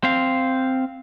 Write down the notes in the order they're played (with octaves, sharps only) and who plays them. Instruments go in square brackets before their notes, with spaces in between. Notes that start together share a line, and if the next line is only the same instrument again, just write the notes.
[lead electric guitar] C4 F5